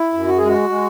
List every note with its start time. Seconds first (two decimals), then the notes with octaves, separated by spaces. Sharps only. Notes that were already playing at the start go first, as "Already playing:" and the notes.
Already playing: E4
0.13 F#2
0.28 F#4
0.38 G#3 G#4
0.48 F#4
0.69 G#3